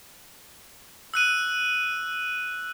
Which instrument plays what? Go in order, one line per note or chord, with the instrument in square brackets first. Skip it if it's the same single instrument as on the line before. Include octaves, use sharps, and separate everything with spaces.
[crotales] E6 F#6 D#7